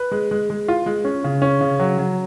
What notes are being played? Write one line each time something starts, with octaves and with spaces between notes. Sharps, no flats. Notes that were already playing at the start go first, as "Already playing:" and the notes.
Already playing: B4
G#3
G#3
G#3
F4
G#3
C#4
C#3
C#4
C#3
F#3
F#3